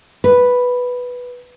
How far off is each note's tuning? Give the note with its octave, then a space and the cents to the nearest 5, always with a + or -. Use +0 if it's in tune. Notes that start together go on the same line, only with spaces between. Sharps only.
B4 +0